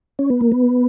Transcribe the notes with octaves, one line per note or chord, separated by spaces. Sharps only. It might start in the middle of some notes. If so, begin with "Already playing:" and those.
C#4
B3
A#3
B3